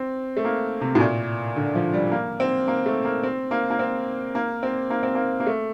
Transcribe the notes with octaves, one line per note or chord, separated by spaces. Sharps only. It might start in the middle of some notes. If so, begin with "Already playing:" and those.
Already playing: C4
A3
A#3
C3
A2
A#2
D3
F3
G3
A#3
C4
A#3
A3
A#3
C4
A#3
A#3
C4
A#3
C4
A#3
C4
A#3
A#3
A3